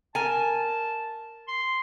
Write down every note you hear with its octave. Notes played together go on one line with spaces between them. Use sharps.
A#4 G#5 A5
C6